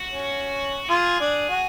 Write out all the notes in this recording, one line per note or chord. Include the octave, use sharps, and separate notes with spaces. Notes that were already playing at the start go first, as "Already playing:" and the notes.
Already playing: F#4
C#4
F4 G#4
D4
F#4